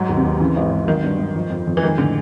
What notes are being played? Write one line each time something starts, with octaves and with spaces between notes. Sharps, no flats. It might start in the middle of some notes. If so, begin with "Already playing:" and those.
Already playing: G#2 F#3
D#2
C3
D#2
C#3 E3
G#1
G#1
D#3 F#3
G2
G2
F3
F2
F2
E3
D#3 G#3
A2 D3